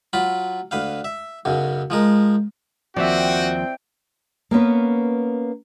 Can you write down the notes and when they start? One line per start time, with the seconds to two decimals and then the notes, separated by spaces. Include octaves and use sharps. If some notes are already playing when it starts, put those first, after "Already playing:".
0.13 F#3 F4 B5
0.71 D2 B4 F5
1.04 E5
1.45 B1 F#2 C#3
1.90 F3 G#3 A#4
2.96 D#2 F3 C4 F#4 D5 E5 G5
4.51 A#3 B3 C#4 B4